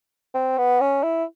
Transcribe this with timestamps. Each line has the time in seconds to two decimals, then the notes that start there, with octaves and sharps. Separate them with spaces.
0.34 C4
0.58 B3
0.81 C#4
1.03 E4